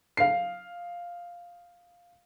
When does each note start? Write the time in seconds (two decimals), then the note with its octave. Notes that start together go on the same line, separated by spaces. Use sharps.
0.17 F5 C7